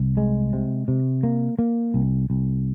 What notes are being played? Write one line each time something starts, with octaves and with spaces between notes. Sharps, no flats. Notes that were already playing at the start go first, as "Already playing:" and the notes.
Already playing: C2
G#3
C3
C3
A#3
A#3
C2
C2